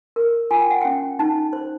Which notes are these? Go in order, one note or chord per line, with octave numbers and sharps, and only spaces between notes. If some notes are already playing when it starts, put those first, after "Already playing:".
A#4
F4 G#5
G5
F#5
C#4 G5
D#4 A5
C5